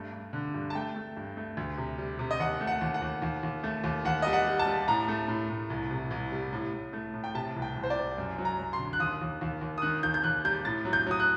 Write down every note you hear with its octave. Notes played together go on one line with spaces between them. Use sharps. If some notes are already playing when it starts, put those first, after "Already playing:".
Already playing: G2 A3
G2
D3
G2
A5
A3 G5
A3
G2
A3
D2
C3
G3
C3
D#5
D#2 F#5
A3
F#5
D#2
F#5
D#2
D#2
D#2
A3
D#2
D#2 F#5
G3 D#5
F#5
G3
A5
G3
A2 A#5
A3
A2
A2
C2
C3
C2
G3
A2
A2
A3
A2
G5
C3 A5
C2
G5
C2
C5
D5
C2
F#2
F#3
A#5
F#3
C6
D3
F#6
D#2 D#6
D#2
D#2
D#2
D#6
D#3 F#6
D#2 G6
G6
D#2 F#6
G3 G6
A2 A6
F#3
G6
F#3 D#6
F#6